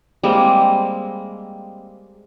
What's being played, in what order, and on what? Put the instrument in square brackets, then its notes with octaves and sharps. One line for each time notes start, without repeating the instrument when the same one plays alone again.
[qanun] G3 G#3 A#3 C4